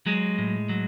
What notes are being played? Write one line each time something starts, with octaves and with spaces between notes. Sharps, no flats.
F#3 G#3
A2
F#3